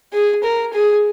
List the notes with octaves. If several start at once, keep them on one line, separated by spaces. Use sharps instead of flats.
G#4
A#4
G#4